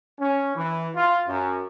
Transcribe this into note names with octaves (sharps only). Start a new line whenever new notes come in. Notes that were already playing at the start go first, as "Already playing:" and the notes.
C#4
E3
F4
F#2